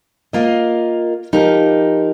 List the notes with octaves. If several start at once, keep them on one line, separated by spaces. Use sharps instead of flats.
A#3 F4 A#4 D#5
F3 D#4 G4 A#4